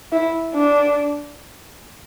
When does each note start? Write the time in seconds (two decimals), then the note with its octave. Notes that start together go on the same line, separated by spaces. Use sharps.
0.12 E4
0.55 D4